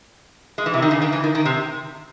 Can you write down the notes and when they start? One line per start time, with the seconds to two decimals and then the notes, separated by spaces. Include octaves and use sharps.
0.58 G#3
0.66 E3
0.74 C3
0.82 D#3
0.91 C#3
1.02 D#3
1.12 E3
1.24 D#3
1.35 D#3
1.45 C3